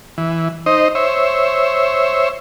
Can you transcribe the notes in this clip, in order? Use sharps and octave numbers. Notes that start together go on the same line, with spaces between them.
E3
D#4 C5 D#5
C5 C#5 E5